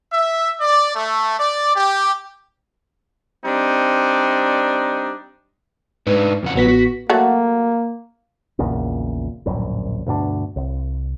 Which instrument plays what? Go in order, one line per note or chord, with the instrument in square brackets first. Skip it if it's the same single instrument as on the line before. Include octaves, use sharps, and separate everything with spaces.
[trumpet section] E5
D5
A3
D5
G4
[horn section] G3 C4 D4 D#4
[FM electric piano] G#2 [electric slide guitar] D4 D#4 B4
[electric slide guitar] F2 C#3 F#5
[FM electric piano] A1 B3 B6 [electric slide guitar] F#3 F#4
[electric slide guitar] F#4
[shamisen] F#3 A3 F#4 [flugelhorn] A#3
[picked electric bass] A#1 E2 A#2 C#3
D1 A#1 F#2 G3
D2 G2 B2 D4
C2